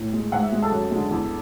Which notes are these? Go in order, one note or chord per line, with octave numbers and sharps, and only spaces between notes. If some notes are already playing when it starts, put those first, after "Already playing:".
Already playing: A2
G#3
G#2 F#5
E5
G#3
A4 A5
F#2
G#3
D3
E2